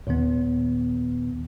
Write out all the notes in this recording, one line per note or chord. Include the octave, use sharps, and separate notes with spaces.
D#2 A#2 D#3 B3